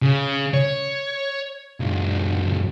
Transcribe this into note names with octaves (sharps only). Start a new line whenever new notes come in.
C#3
C#5
C#2 F#2